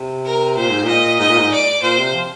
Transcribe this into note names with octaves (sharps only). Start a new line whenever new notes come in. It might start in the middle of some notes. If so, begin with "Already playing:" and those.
Already playing: C3
A#4
A#2 C5
G#2
A#2 D#5
G#2 D#5
A#2
G#2
D5
A#2 C5
C3
F3